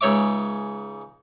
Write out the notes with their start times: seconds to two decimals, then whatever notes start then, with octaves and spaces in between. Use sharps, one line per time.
0.01 C#2 G#2 C#5 E5 D6